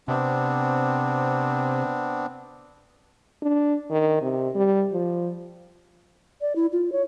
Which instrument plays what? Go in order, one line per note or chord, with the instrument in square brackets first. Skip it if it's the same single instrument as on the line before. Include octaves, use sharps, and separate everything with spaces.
[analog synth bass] C3 [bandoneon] B3 C4 D4
[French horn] D4
D#3
C3
G3
F3
[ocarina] D5
E4
F4
C#5